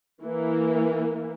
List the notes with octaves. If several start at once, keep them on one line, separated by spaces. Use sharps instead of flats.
E3 A#3